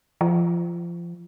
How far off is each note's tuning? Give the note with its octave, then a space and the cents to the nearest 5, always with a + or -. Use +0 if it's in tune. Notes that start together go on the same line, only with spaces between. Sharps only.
F3 -25